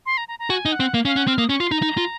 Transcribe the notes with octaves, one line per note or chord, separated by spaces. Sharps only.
C6
A#5
A#5
A#5
F#4 G#5
D#4
F#5
C4
A#3 F5
C#4 F5
C#4 F#5
C4 F6
A#3 D#6
C#4 C#6
F4 C6
D#4 A#5
D#4
F4